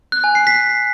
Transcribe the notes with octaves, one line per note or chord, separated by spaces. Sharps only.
F#6
G#5
C7
B6